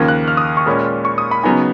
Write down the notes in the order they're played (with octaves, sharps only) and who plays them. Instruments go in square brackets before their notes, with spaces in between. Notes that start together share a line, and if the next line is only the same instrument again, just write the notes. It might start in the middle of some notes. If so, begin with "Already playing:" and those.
Already playing: [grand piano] D#2 C#3 F3 A#3 G#6
F#6
F6
D#6
C#6
A#2 G#3 C#4 B5
C#6
D#6
B5
C#3 F#3 B3 D#4 G#5